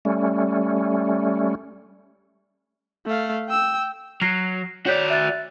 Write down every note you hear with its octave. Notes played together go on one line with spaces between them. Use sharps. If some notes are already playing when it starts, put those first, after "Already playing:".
G3 A3 C#4
A3 F5
G5 E6
F#3 F6 A#6 C7
F#4 C#5 D5 G6 B6
E5 F#6 A6